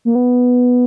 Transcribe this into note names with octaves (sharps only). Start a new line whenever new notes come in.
A#3
B3